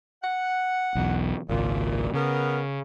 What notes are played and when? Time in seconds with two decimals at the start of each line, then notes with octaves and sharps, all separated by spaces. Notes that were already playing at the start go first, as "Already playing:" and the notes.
0.23 F#5
0.95 B1 E2
1.49 G#1 C#2 A#2
2.14 C#3 B3 A#4